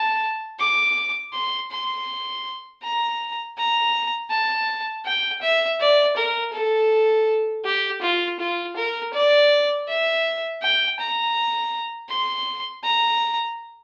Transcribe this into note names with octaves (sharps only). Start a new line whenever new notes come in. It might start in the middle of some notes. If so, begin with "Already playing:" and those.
Already playing: A5
D6
C6
C6
A#5
A#5
A5
G5
E5
D5
A#4
A4
G4
F4
F4
A#4
D5
E5
G5
A#5
C6
A#5